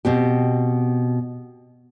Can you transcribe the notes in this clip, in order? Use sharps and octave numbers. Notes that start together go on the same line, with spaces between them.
B2 C4 G4